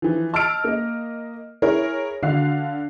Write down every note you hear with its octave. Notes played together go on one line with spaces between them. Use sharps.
E3 F3
D#5 A5 E6 F6 D7
A#3 D#5
E4 G#4 A#4 C#5
D3 D4 F#4 F5 F#6 C7